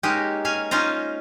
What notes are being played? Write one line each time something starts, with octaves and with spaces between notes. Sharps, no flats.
G#3 A#3 C#4 D#4 G4
C#4 F5 G#5
C#4 D#4 F4 C5 A#5